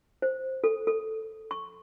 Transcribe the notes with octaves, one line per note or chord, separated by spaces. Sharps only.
C5
A4
A4
C#6